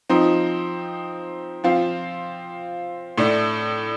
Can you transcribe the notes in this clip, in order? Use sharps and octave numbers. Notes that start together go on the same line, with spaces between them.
F3 C4 D#4
F3 C4 F4
A2 A3 D4